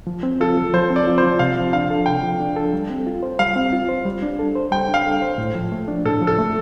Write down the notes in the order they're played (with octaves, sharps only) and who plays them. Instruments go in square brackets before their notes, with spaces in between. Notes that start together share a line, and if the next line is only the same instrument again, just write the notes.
[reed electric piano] F3
C4
[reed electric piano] F4 [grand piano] A4
[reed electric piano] F3
[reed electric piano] F3 [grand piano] C5
[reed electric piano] C4
[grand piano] D5
[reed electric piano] F4
[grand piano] C5
[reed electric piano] F3
[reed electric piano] C3 [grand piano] F5
[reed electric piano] F3
[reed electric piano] D4 [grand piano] F5
[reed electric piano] A4
[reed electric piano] C3 [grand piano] G5
[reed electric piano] F3
D4
A4
G3
C4
F4
C5
[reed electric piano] G3 [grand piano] F5
[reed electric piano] C4
F4
C5
G3
D4
A4
C5
[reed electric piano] G3 [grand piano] G5
[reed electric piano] D4
[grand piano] F5
[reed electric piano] A4
C5
A2
F3
A3
D4
[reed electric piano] A2 [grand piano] A4
[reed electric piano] F3
[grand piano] A4
[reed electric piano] A3